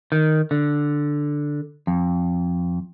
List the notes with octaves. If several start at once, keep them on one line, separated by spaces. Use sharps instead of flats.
D#3
D3
F2